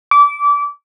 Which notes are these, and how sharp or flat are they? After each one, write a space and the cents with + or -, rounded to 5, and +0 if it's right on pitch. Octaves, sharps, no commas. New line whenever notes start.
D6 -25